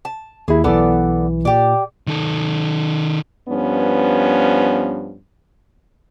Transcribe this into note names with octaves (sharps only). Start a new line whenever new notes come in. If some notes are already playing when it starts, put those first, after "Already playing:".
A5
D#2 E4 G#4
B1 E3 B3 A4 D5
A#2 G4 D5
D#3 A4
G2 F3 B3 C#4